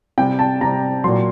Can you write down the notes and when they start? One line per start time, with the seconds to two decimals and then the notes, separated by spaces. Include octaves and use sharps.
0.18 C3 G3 G5
0.39 A5
0.61 C3 G3 A#5
1.04 A#2 F#3 C6